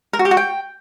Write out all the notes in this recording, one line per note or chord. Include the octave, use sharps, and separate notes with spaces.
A#4
F#4
G4
F#4
G5